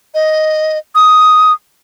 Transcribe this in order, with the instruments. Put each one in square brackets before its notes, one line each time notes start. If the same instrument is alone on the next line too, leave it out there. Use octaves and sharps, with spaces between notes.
[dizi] D#5
D#6